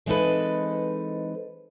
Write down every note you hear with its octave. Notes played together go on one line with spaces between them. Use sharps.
E3 G#3 C4 D#4 A4 B4